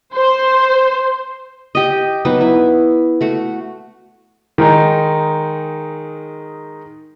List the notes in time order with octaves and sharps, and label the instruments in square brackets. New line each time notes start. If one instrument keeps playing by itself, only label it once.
[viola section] C5
[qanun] G4 D#5
F#3 B3 D#4 B4
E4
A3 F#4
[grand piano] D#3 G#3 D#4